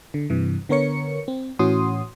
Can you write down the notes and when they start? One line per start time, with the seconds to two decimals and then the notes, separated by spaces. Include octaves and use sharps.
0.14 D3
0.30 G2 C3 E3
0.69 D3 B3 A#4 C#5 C#7
1.28 C4
1.59 A2 E3 C#4 F#4 C6 D#6